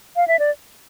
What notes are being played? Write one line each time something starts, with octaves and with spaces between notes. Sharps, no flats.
F5
E5
D5